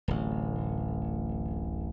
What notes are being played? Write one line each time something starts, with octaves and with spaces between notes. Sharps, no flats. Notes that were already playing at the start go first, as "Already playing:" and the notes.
D1 A1